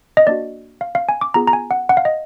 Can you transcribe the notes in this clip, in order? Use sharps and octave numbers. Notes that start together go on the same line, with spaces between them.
D#5
A#3 D4 F#4 D5
F5
F5
G#5
D6
B3 F4 G#4 A#5
A#5
G#5
F#5
F#5
F5
D#5